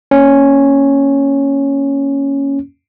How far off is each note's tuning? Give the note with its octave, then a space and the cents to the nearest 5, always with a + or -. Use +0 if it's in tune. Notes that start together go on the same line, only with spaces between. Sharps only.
A#3 +0 C#4 +0